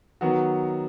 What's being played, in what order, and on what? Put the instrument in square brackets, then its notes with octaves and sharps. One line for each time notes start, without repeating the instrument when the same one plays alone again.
[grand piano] D#3 F#3 B3 F#4